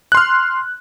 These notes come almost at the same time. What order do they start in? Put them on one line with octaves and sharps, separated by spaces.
F#6 C6 F6